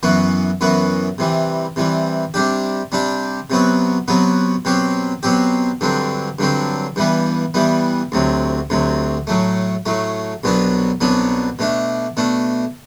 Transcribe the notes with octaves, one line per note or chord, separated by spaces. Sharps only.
F#2 E3 B3 F#4
F#2 E3 B3 F#4
C3 E3 G3
C3 E3 G3
C3 G3 D4 G4
C3 G3 D4 G4
C3 F#3 B3 F#4
C3 F#3 B3 F#4
B2 F#3 C4 G4
B2 F#3 C4 G4
G2 D3 F#3 C4
G2 D3 F#3 C4
G2 E3 G3 B3
G2 E3 G3 B3
D2 C3 F#3
D2 C3 F#3
A2 F#3 A3
A2 F#3 A3
C2 B2 F#3 B3 D4
C2 B2 F#3 B3 D4
B2 A3 D4
B2 A3 D4